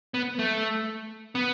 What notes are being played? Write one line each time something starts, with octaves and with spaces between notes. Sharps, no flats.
B3
A3
B3